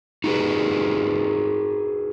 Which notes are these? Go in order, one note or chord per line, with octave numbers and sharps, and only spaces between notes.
D#4 F#4 G#4 B4